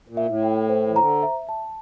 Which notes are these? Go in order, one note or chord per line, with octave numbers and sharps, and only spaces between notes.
A#2
E5
A2
G5
C5
E3
D3 A#5
E5
A5